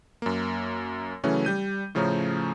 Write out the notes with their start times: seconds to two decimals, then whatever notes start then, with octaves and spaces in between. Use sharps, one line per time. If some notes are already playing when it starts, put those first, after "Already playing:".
0.22 F#2 A#3
1.24 C#3 E3 F#3 A3 C#4
1.45 G3 G6 D#7
1.95 A2 C#3 F3 A3 C#4 A#5